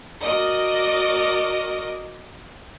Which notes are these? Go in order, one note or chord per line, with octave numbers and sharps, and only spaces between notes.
F#4 A#4 D5 D#5 D#6